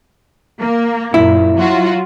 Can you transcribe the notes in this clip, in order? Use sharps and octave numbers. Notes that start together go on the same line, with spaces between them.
A#3
F#2 A#2 E4
F#3 F4 F#4